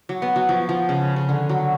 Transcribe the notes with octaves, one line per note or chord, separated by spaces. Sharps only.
F#3
B3
F#3
F3
F3
C#3
C#3
D3
F#3